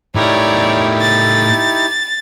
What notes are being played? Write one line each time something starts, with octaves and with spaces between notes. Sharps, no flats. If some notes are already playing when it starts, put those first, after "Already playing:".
A2 D#4 E4 G4 A#4 C#5 D5
A6